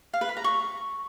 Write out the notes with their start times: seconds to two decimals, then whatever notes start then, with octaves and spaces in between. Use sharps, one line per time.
0.13 F5
0.21 B4
0.29 B5
0.37 A#5
0.44 C#6